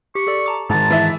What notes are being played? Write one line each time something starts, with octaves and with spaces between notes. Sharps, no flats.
G4 C#6
G4 A4 D5
A5 A#5 D6
G#2 D#3 A5 A#5
E3 E5 A6